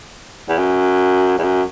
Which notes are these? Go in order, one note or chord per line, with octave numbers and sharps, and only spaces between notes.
E2
F#2
E2
F#2